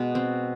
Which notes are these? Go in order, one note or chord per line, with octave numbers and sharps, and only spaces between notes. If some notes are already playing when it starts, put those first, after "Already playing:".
Already playing: B2 G#3
C4